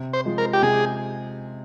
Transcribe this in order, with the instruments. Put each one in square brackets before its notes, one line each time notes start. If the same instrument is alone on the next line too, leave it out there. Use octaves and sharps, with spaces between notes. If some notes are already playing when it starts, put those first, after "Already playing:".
Already playing: [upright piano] C3
[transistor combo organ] C5
[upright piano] F3 G#3
[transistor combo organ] A#4
G4
[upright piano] C3 [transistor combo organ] G#4